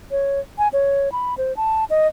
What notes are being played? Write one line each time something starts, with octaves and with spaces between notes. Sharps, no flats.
C#5
G#5
C#5
B5
C5
A5
D#5